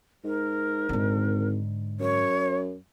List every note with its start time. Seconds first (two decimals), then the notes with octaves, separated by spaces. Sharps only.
0.24 G#2 A#4
0.89 G#1 G#2 D3
2.00 F#2 C#5